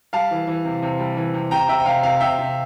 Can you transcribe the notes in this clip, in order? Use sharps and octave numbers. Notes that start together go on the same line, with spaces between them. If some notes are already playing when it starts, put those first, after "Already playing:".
G3 F5 A5
E3
E3
C3
C3
G3
E3
C3
C3 G5 A#5
C3 E5 G5
G5
C3 F5
C3 F5
C3 E5 G5
C3